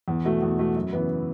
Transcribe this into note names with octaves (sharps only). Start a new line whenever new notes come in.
E2
B2 A3 F#4
E2
B2 A3 F#4
F#2
C#3 E3 B3